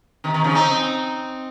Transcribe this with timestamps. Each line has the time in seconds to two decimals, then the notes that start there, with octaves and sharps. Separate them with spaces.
0.24 C3 D#3
0.34 C3 D#3
0.44 C#3 F3
0.55 C4 D#4